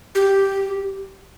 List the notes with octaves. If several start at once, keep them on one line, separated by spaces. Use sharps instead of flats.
G4